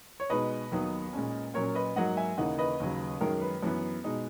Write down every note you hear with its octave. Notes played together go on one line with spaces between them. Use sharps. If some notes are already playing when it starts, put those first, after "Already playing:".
C#5
B2 G#3 D#4 B4 D#5
D#2 D#3 F#3 B3 D#4
A#2 G#3 C#4
A#2 F#3 C#4 A#4 C#5
B4 D#5
G#2 F#3 A#3 D#5 F#5
E5 G#5
D#2 C#3 E3 A#3 D#4 D#5 F#5
B4 D#5
D#2 C#3 F#3
F#2 D#3 G#3 C#4 A#4
B4
F#2 E3 B3
B2 G#3 D#4